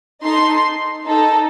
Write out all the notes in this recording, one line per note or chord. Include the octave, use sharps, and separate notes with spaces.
D#4 A4 C6
D#4 A4